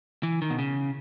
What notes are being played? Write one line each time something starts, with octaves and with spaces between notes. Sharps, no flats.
E3
D#3
B2
C#3